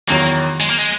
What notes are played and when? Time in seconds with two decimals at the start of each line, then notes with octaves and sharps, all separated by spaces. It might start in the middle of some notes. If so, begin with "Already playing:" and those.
0.08 E2 D#3 F#3 A#3
0.60 G#3
0.70 A#3
0.79 G#3